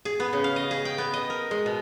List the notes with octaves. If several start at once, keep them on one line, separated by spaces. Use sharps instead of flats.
G#4
B3
C#3
F5
D#5
G#4
G5
B3
D#5
A#4
G#3
B2